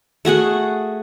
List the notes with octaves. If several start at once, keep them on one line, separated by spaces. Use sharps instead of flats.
A3 F#4 G#4 F#5